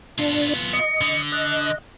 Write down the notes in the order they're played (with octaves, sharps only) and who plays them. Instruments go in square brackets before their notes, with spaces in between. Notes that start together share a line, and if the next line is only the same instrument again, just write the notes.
[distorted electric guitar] B3 F4 [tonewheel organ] D4
[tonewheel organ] D#5 [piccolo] C#7
[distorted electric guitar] D3
[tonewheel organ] D#5 [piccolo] F#6